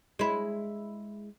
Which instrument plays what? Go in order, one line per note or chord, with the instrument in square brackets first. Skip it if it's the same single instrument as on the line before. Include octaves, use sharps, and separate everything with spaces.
[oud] G#3 E4